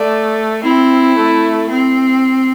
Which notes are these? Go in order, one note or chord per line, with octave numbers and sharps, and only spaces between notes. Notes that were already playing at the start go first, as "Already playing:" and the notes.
Already playing: A3 D5
C4 E4
A3
C4